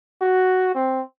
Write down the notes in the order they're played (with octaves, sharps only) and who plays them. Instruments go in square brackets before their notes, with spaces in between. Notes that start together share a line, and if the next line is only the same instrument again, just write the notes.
[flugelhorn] F#4
C4